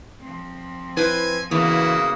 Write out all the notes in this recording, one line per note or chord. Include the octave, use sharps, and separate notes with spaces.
F3 C4
E4 B4 C5 G#5
E2 C#3 E3 A#3 B3 E4 F#4 D#6